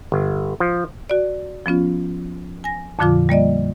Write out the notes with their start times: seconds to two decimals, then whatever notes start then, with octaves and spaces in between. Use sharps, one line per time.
0.12 G1
0.60 F3
1.10 F#4 D5
1.66 F3 B3 C#4 F4
2.64 G#5 A#6
2.99 F2 A#2 D3 F3 F4 D6
3.29 G3 A#3 D5 D#5